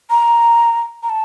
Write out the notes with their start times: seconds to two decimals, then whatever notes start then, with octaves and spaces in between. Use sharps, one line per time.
0.10 A#5
1.03 A#5
1.09 A5